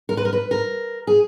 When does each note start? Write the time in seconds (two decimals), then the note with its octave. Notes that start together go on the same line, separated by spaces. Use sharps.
0.09 A#4
0.17 B4
0.25 A#4
0.33 B4
0.51 A#4
1.07 G#4